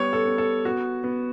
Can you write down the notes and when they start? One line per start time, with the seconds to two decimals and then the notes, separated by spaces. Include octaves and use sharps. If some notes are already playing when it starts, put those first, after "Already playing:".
Already playing: G3 B3 C#5
0.13 A4
0.26 B3
0.38 A4
0.65 B3 F#4
1.04 B3